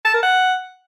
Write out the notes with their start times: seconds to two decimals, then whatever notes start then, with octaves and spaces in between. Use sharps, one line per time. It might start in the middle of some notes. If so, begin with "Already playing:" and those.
0.05 A5
0.14 A#4
0.23 F#5